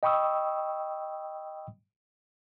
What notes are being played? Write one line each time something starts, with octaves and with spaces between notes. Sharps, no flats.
D#5 G5 B5 C#6 D#6 E6